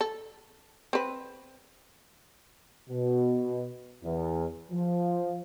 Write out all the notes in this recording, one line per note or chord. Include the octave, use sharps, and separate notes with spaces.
A4
C4 B4
B2
E2
F3